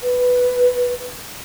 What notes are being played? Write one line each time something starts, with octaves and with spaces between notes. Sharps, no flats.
B4